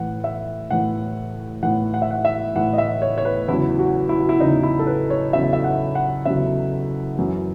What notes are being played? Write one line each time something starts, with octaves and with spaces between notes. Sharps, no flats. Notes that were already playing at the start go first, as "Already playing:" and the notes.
Already playing: A2 E3 F#5
E5
A2 E3 F#5
A2 E3 F#5
F#5
E5
F#5
E5
A2 E3 F#5
D#5
E5
C#5
C#5
B4
E2 C#3 F#3 E4
F#4
E4
F#4
E4
E2 C#3 F#3 D#4
E4
A4
B4
C#5
E2 C#3 F#3 E5
E5
F#5
F#5
E2 C#3 F#3 E5
F#2 E3